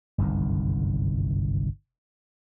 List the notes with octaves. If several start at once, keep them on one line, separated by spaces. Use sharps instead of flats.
G1 C2 F#2 D#3